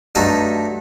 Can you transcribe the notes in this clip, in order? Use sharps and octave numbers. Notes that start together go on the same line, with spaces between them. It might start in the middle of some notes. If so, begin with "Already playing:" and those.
G2 F#3 A3 D#4 A4